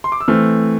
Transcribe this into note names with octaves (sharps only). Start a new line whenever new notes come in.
C6
D6
E6
E3 A3 C4 F6